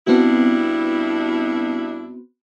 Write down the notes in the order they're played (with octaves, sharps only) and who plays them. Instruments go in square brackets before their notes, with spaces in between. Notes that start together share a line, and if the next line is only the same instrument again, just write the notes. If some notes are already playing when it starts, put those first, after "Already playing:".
[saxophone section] G2 D4 E4 [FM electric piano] B3 C4 F#4